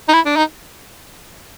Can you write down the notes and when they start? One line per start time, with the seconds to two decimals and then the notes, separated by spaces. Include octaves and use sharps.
0.09 D#4
0.13 E4
0.26 D4
0.37 D#4